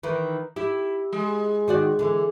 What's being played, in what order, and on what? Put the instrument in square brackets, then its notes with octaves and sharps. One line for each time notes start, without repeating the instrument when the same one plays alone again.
[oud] D#3 E3
[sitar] E4 [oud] G4
[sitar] G#3
[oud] D#3 F#4 D5
D3 E3